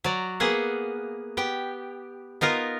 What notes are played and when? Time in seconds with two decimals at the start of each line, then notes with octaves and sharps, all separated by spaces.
0.04 F#3 D5 A#5
0.40 A#3 B3 G#4 E5 F#5
1.37 B3 G4 G5
2.41 B3 D#4 F4 A#4